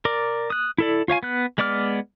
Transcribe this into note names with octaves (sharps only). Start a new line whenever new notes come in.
A#4 D5
D#6 F#6
E4 A4 D5
F4 C#5 F5 G#5
B3 F#6
G#3 B3 D5 D6 F6